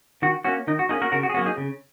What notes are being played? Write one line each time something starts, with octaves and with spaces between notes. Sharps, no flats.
D#3 F#4
A#3 C#4 F#4
D#3 D#4
F#4
A#3 C#4 D#4 G#4
F#4 A#4
C#3 F#4 A#4
F#4
G#4
F#3 A#3 C#4 F#4
D#4 G#4
C#3